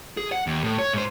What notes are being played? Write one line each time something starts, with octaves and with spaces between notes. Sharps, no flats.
G#4
F#5
D#2
A2
C#5
G#2 C5